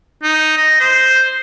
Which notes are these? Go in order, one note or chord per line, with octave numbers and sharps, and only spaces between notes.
D#4
D#5
C5